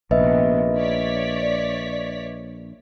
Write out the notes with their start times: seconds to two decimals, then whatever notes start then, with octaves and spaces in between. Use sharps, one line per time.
0.11 A#1 C3 D#3 B3 B4 D#5 E5
0.77 C#5 D5 B6